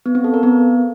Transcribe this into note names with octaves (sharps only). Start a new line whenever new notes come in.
B3
C4
A4
A#4
B3